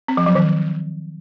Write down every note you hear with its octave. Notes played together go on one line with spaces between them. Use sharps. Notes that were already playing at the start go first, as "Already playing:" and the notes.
C4
F3
F#3
D#3